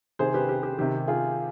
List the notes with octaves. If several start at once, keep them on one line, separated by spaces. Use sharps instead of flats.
C3 D#3 G#4 C5
G4 B4
G4
G4
C3 D#3 G4
F4 G#4